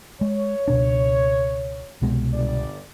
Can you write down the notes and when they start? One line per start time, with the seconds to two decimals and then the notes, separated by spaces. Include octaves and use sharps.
0.21 G#3 C#5
0.68 C#2 B2 D4
2.02 C2 B2 G#3
2.34 G1 G3 D5